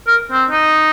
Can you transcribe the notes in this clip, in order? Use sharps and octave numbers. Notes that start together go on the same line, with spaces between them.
A#4
C4
D#4